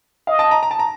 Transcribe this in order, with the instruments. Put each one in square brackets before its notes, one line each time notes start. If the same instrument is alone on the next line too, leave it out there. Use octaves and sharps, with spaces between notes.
[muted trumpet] D#5 [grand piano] F5
[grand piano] A5
A#5
A#5
A5
A#5